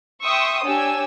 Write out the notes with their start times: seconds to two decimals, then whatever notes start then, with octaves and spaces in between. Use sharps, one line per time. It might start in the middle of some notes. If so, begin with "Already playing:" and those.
0.22 E5 G5 C6 C#6 D#6 E6
0.65 D4 G4 C#5 G#5 E6